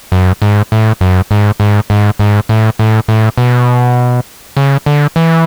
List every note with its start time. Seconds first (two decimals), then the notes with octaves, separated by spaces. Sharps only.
0.12 F#2
0.42 G#2
0.72 A2
1.01 F#2
1.31 G#2
1.60 G#2
1.90 G#2
2.19 G#2
2.49 A2
2.79 A2
3.08 A2
3.38 B2
4.57 C#3
4.86 D3
5.16 E3